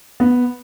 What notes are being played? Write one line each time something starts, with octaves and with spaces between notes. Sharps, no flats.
B3